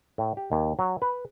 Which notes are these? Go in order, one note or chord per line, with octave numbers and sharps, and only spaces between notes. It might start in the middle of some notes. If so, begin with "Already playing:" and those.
A2
G4
D#2
F#3
B4